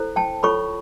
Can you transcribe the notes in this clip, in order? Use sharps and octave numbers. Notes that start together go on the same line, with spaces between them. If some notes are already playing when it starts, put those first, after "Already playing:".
Already playing: E4 A4 C5
G5 A5
F4 A4 C#5 B5 C#6